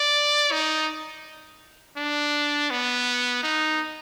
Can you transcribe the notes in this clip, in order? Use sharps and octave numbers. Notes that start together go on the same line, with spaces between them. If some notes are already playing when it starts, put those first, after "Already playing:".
Already playing: D5
D#4
D4
B3
D#4